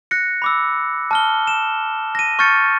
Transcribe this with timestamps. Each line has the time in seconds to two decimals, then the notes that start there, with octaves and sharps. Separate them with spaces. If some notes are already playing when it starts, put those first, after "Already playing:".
0.11 F#6 A#6 C#7
0.42 B5 D6 E6
1.11 A5 F6 G7
1.47 E7
2.15 A#6 D#7
2.39 C#6 F6 G6 A6 C#7